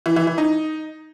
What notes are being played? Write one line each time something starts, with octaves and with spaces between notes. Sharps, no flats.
E3
E3
E3
D#4